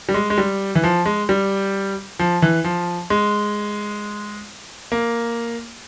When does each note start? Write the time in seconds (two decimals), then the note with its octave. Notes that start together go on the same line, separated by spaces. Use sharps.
0.09 G3
0.14 G#3
0.30 G#3
0.38 G3
0.75 E3
0.84 F3
1.06 G#3
1.29 G3
2.19 F3
2.42 E3
2.64 F3
3.10 G#3
4.92 A#3